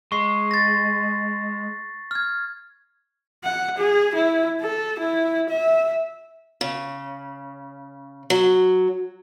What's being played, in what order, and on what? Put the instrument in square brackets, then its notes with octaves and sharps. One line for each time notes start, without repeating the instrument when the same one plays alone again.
[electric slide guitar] G#3 [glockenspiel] C#6 C7
[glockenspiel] A6 A#6
F6 G#6
[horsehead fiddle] F#5
G#4
E4
A4
E4
E5
[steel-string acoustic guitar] C#3
F#3